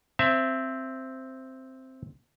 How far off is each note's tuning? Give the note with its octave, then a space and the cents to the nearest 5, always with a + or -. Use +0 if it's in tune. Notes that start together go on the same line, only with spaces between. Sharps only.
C4 +0 E5 +20 A5 -20